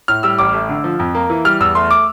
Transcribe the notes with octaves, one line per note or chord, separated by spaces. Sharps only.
A2 F6
G3 E6
A1 D6
A3
D3
F3
F2
A#3
E3
G3 F6
E2 E6
A3 C6
D6